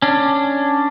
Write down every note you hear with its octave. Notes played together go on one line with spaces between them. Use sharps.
C#4 D4